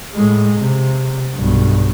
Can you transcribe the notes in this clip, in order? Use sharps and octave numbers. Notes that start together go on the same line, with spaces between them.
A2 G#3
C3
B1 G2